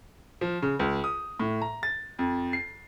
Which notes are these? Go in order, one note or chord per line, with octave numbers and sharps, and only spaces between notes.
F3
C#3
C#2
D#6
A2
A#5
A6
F2
C7